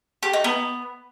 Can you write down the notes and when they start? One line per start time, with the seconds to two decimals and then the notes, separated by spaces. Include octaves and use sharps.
0.23 G4
0.33 D#4
0.44 B3